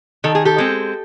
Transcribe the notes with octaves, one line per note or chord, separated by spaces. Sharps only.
D#3 A4
G#4
G4 A4
G#3 C4